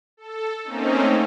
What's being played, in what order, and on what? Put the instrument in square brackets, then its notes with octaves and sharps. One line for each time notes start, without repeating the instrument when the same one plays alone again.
[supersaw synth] A4
A3 A#3 C4 C#4 D#4